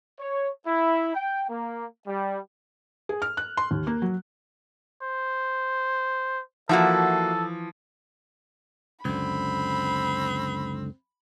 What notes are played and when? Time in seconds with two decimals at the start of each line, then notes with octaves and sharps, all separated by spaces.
0.20 C#5
0.67 E4
1.15 G5
1.49 A#3
2.07 G3
3.09 G#4
3.22 F6
3.37 F#6
3.57 C6
3.71 D#2
3.87 A#3
4.02 F#3
5.02 C5
6.69 E3 F3 A#3 F#4 A4 E5
9.05 C#2 F#2 D3 C4 B5